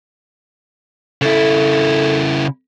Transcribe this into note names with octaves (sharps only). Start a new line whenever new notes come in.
C#3 E4 A4